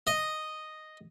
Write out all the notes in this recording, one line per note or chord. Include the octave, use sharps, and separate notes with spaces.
D#5